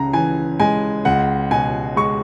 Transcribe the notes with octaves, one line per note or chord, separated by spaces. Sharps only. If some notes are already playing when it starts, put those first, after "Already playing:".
Already playing: C#2 C#3 A#5
E3 G#5
G#3 G#5
C#2 F#5
B2 G#5
G#3 C#6